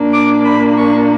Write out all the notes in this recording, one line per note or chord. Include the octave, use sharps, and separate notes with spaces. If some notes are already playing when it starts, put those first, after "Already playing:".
Already playing: A#2 A#3 D4
D6
B5
C#6